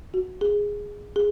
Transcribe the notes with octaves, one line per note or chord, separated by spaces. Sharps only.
F#4
G#4
G#4